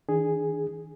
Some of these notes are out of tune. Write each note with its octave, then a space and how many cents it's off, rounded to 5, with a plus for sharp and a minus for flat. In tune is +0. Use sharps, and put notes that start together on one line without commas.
D#3 +40 D4 +0 G#4 -5